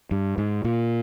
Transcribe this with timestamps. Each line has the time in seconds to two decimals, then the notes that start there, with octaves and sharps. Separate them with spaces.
0.11 G2
0.38 G#2
0.64 A#2